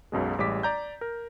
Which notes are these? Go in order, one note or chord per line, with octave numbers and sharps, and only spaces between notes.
B1 F#2 B2 G#3
A1 G3 G#3 D6 B6
D5 A#5 G6
A#4